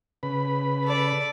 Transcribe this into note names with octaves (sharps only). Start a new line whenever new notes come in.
C#3 B4 B5
A4 D5